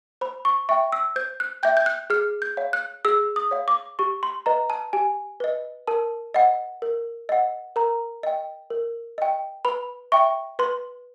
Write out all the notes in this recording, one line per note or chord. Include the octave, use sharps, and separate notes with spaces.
C5 B5
C#6
E5 G5 C#6
E6
C5 G6
F#6
E5 G5 G6
G6
F#6
G#4 F6
G6
C#5 F5
F#6
G#4 E6
D#6
C#5 F5
D6
G4 C#6
C6
B4 D#5 A#5
A5
G4 G#5
B4 D#5
A#4 A5
D#5 F#5
A#4
D#5 F#5
A#4 A#5
D#5 G5
A#4
D#5 G5
B4 B5
E5 G5 C#6
B4 C6